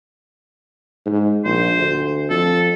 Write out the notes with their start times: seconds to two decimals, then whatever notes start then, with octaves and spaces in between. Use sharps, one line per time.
1.06 G#2
1.45 A#1 C5
1.77 D2
2.30 F2 A4